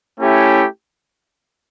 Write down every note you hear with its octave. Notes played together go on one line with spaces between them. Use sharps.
A3 C#4 E4 G4